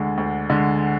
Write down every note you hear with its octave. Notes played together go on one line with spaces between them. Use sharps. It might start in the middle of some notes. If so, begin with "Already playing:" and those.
Already playing: D2 D3 G#3
D2
D3 G#3